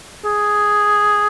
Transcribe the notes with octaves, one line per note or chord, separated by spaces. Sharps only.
G#4